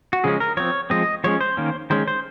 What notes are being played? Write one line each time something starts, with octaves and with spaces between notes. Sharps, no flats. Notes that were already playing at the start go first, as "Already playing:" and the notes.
F#4
C#3 F3 G#3 C#4 G#4
A#4
F3 C4 C#5
F3 G#3 C4 D#5
F3 G#3 C#4 C#5
C5
D#3 A#3 C#4
D#3 G#3 C#4 C5
C5